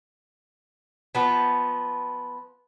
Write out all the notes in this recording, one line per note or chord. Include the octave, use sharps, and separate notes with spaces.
F3 B3